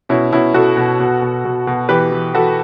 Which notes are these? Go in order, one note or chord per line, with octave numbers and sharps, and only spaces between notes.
B2 C#4 E4
B2 C#4 E4
B2 F#4 A4
B2
B2
B2
B2
B2
E3 G4 B4
E3
E3 F#4 A4